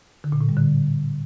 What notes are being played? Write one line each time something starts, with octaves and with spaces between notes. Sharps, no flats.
D3
A#2
A2
G3
D3